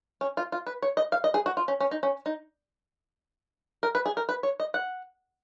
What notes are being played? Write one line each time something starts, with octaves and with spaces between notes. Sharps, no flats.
C#4
F4
F4
B4
C#5
D#5
F5
D#5
G#4
F#4
F4
C#4
C#4
D#4
C#4
D#4
A#4
B4
G#4
A#4
B4
C#5
D#5
F#5